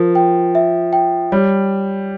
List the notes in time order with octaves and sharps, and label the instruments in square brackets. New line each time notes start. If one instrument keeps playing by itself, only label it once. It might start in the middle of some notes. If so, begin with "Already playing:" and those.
Already playing: [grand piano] F3 [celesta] A#4
[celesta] G5
E5
G5
[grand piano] G3 [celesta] C#5